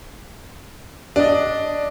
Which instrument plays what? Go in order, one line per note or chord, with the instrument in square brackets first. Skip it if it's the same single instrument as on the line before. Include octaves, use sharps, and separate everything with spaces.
[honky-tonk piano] D4 D#5